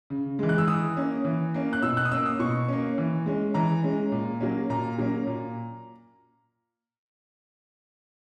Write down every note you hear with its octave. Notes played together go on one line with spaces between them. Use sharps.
C#3
E3 G#3
F#6
E6
E3 D#6
A#3 C#4
E3
A#3 C#4
F#6
B2 E6
F#6
D#6
A#3 C#4 E6
D#6
B2 C#6
A#3 C#4
E3
G#3 C#4
E3 A#5
G#3 C#4
A#2
F#3 A#3 C#4
A#2 A#5
F#3 A#3 C#4
A#2